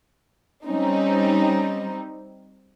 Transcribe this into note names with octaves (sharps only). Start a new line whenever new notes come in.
G3 C4 C#4 D#4